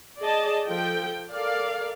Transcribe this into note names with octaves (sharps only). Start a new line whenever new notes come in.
G#4 D5 D#5 A5
F3 A4 G5
A4 A#4 D5 F5